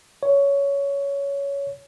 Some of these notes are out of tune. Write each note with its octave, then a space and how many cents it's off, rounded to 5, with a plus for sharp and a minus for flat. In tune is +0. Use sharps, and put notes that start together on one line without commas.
C#5 +15